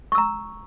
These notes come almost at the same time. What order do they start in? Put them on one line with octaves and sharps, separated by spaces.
C#6 E6 A#5